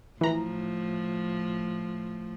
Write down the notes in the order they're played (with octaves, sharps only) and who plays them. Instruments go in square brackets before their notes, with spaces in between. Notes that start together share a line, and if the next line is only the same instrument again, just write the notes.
[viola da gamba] A2 F3 [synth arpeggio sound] E3 A#5